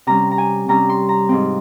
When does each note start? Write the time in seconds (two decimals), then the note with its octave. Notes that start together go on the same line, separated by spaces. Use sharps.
0.07 C3 G3 C#4 A#5
0.31 A#5
0.38 G#5
0.68 C3 G3 C#4 A#5
0.89 C6
1.09 A#5
1.29 G#2 F3 C4